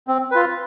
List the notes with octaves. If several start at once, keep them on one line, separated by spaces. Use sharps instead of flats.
C4
F4 B4